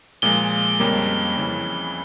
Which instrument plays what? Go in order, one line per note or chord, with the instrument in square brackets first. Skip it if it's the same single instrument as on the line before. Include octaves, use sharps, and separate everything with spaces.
[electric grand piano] A#2 F3 G#3 [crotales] G7
[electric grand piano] F2 C#3 G3 A#3
F2 C#3 E3